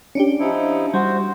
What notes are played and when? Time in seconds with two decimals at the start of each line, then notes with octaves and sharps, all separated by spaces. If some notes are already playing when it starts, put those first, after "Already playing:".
0.15 C#4 D4 G4
0.39 F3 D#4 E4
0.94 G3 F#4 C5